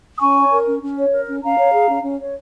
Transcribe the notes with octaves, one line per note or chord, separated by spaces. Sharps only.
D#6
C#4 G#5 C#6
C#5
A#4
C#4
C#4
C#5
A#4
C#4
C#4 F5 A#5
C#5
G#4
C#4
C#4
C#5